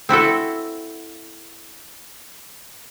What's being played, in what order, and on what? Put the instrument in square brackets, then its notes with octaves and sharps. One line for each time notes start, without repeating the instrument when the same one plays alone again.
[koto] C4 E4 F#4 A4